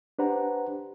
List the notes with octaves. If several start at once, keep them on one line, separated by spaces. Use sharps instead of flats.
D4 G4 B4 C5 F#5 A#5